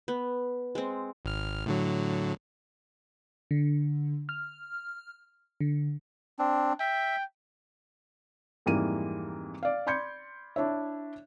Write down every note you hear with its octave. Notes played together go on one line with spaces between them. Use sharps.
B3
G#3 C4
G#1 F6
A2 D3 F#3
D3
F6
D3
C4 D4
E5 G5
F2 G#2 E3 G3 A#3 D#7
D5 F5
D5 B5 C6 G6 G#6 C#7
D4 E4 C#5 E5